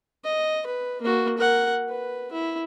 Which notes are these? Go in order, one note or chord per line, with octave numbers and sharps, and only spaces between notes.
D#5
B4
A#3 F#4
A#4 F#5
B4
E4